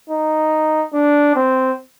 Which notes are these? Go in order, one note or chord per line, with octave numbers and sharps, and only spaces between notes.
D#4
D4
C4